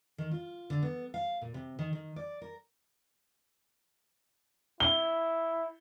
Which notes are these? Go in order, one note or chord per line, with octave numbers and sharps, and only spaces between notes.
D#3
F4
D3
B3
F5
A#2
C3
D#3
D#3
D5
A#4
E4 G7